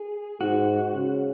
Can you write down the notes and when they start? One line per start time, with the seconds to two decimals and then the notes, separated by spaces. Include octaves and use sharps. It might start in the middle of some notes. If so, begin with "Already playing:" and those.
Already playing: G#4
0.40 G#2 F#4
0.94 C#3